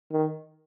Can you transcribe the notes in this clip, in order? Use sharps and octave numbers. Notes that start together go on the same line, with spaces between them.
D#3